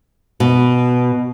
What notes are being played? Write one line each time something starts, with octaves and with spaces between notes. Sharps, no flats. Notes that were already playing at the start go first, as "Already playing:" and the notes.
B2